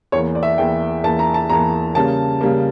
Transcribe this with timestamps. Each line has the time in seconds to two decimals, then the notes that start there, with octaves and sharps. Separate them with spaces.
0.12 E2 E3 A#3 C#5
0.35 D5
0.43 E5
0.58 E2 E3 A#3 G5
1.04 E2 E3 A#3 A5
1.19 A#5
1.34 A5
1.49 E2 E3 A#3 A#5
1.95 C#3 G3 A#3 A5
2.41 C#3 G3 A#3